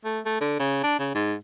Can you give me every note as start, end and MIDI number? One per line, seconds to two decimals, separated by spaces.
0.05 0.20 57
0.25 0.40 57
0.41 0.56 50
0.60 0.80 49
0.83 0.98 62
0.99 1.14 49
1.15 1.35 44